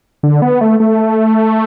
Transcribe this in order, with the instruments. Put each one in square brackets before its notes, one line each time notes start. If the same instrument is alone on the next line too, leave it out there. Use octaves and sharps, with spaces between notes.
[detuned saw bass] D3
B3
A3
A3